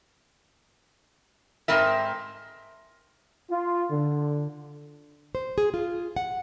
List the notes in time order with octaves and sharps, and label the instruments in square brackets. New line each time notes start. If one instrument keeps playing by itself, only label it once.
[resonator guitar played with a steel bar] G#2 C4 A#4 E5
[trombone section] F4
D3
[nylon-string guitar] C5
G#4
F4
F#5